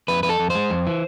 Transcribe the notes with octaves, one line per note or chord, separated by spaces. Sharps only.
F2 B4
F2 B4
A4
F2
C5
G#3
F2
E3